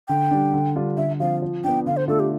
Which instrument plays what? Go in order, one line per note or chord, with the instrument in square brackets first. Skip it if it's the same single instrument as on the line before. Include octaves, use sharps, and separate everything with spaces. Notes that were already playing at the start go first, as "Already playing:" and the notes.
[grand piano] D3 [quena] G5
[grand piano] G3 D4
D3
G3 D4 F4
[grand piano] D3 [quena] E5
[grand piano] F3 C4 [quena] F5
[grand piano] F3
[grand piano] B3 D4 [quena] G5
[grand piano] D3 [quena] F5
[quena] C5
[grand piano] A3 D4 F4 [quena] A4
[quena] G4